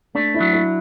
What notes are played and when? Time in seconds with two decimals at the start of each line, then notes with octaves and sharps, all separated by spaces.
0.15 A3 D4
0.34 E4
0.40 F#3
0.53 E4